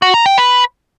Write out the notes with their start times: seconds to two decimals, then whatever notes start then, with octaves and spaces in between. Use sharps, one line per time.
0.02 F#4
0.14 A#5
0.26 G5
0.38 B4